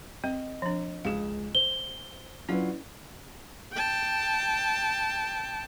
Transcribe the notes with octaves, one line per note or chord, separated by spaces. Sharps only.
C4 D#5
F3 D4
C#2 G#4 F5 E7
C5 G7
F#3 C#4 D4 E4 F4 B4
G5 A5